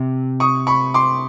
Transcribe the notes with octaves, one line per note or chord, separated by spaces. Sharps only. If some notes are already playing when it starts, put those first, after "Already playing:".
Already playing: C3
C#6 D#6
B5 C#6
C6 D6